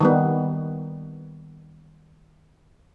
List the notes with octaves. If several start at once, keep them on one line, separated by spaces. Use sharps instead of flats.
D#3 G3 B3